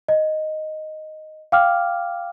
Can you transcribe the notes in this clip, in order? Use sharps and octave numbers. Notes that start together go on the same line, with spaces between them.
D#5
F5 G5 D6 F6